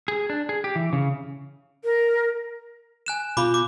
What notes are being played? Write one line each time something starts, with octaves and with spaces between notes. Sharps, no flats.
G#4
D4
G#4
G4
E3
C#3
A#4
G#5 F#6 E7
B2 F4 B5 D6 G6
D6